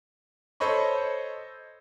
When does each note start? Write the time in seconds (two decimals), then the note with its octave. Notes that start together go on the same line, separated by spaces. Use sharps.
0.60 A4 C5 C#5 D#5 B5 C#6